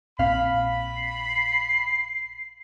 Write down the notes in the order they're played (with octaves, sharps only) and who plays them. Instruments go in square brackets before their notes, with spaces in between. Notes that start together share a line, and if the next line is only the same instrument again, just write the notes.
[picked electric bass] A#1 A#2 C4 [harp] F5 [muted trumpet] B5
[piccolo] C7